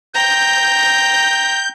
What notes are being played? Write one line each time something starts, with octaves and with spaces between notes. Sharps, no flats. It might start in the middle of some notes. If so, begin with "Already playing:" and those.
G5 A#5 G6